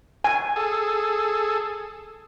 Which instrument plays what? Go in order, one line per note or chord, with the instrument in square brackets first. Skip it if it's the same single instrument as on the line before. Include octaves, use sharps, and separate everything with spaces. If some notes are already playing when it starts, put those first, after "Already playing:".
[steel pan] G#5
[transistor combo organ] G#4 A4